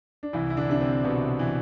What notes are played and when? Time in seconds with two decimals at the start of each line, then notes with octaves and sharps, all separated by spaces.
0.23 D4
0.33 C2 E3 E4
0.50 E4
0.57 D3 D4
0.69 C3 D4
0.81 C3 C4
1.04 C2 B2 B3
1.39 E3